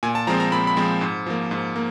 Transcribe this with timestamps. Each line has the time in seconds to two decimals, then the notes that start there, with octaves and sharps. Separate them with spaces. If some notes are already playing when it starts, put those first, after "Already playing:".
0.03 A#2 G#5
0.15 A5
0.27 F3 G#3 C4 A#5
0.40 A#5
0.52 A#2 B5
0.67 B5
0.77 F3 G#3 C4
1.01 G#2
1.26 F3 A#3
1.51 G#2
1.76 A#3